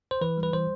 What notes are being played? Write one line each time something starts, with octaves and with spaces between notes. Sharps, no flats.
C5
E3 B4
G3
B4
E3 C5